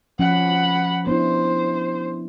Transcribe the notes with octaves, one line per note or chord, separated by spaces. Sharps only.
F3 C#4 F#5 B5
B3 D4 E4 C5